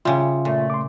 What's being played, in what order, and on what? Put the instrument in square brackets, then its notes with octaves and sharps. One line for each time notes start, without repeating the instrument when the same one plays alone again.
[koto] C#3 G3 [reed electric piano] F4 E5 C6
[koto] A#2 [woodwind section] A3
[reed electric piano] C6 D6